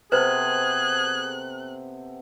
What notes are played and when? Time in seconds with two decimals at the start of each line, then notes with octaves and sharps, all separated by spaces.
0.12 C3 B3 G#4 A4 B4 C5 F#6